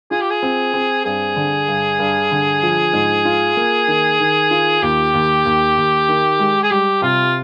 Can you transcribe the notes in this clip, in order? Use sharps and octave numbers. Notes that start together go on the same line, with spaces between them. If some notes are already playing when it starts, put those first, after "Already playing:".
F4 G#4
G4
G#4
C4
C4
G2 G#4
D3
G2
G2
D3
F3
G#2
F4
A#3
D#3
D#3
F4
D#2 G4
D#2
D#2
D#2
D#3
G#3
G#4
G3 G4
C3 F4